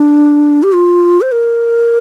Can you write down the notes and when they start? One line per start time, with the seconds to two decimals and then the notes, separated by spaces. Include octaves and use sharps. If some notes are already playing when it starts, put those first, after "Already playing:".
Already playing: D4
0.63 G4
0.73 F4
1.21 C5
1.32 A#4